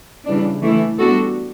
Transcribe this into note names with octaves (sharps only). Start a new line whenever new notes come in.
C#3 E3 G3 D4
E3 A3 E4
G3 B3 D4 F#4 A4